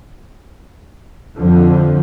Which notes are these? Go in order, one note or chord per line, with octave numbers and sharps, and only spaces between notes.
F2 D3 F3